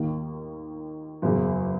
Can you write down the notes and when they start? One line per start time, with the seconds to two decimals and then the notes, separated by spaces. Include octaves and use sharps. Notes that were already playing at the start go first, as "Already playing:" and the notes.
Already playing: D#2 D#3 A#3
1.22 F#1 E2 C#3